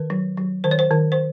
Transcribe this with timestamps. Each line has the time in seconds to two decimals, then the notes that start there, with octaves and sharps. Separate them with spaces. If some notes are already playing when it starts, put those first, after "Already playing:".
Already playing: D#3 B4
0.10 F#3
0.37 F#3
0.64 D#3 C5
0.71 C#5
0.79 C5
0.91 D#3
1.12 C5